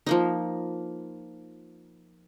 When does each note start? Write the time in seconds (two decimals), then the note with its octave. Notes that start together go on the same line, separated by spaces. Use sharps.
0.07 F3 A#3 D#4